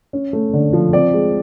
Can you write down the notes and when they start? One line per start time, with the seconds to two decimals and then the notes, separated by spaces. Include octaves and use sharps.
0.13 C#4
0.33 A3
0.53 D3
0.73 F3
0.93 C4 D5
1.14 G#3